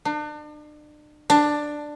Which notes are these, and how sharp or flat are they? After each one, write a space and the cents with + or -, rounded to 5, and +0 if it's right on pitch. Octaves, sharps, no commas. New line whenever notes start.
D4 +40
D4 +10